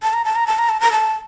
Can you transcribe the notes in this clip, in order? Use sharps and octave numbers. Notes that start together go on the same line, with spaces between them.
A5
A#5
A5
A#5
A5
A#5
A5
A#5
A5